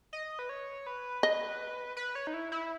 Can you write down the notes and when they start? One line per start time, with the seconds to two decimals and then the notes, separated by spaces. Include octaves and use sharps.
0.13 D#5
0.39 B4
0.49 C#5
0.87 B4
1.23 D#5
1.97 B4
2.15 C#5
2.27 D#4
2.34 E4
2.52 E4